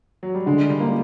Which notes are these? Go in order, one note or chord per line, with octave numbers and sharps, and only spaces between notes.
F#3
G3
D3 G#3
G3
A#3